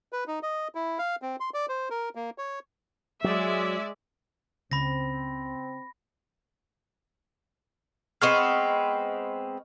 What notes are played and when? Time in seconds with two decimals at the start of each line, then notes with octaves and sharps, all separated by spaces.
0.12 B4
0.27 D#4
0.43 D#5
0.75 E4
0.99 F5
1.22 C4
1.40 C6
1.54 D5
1.69 C5
1.90 A#4
2.15 A#3
2.38 C#5
3.24 F#3 G#3 D5 E5
4.71 C#2 C#3 C4 B5 A#6
8.22 G#3 B3 C4 D#5 C#6 F6